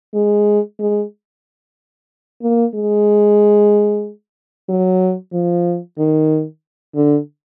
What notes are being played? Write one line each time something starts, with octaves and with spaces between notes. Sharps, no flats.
G#3
G#3
A#3
G#3
F#3
F3
D#3
D3